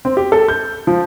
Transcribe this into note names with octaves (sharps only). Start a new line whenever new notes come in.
C4
G4
A4
G6
F3